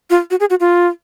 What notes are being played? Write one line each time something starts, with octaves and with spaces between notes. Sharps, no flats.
F4
F#4
G#4
F#4
F4